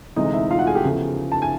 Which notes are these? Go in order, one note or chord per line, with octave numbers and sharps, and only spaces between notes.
D2 C3 E3 G#3 D#4 D#5
E4 E5
F4 F5
F#4 F#5
G#4 G#5
G4 G5
E2 C#3 F3 A3
A5
G#5